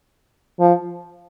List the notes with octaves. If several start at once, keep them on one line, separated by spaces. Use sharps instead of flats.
F3